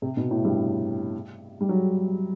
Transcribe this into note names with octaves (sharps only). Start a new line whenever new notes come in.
C3
B2
A2
G2
G3
F#3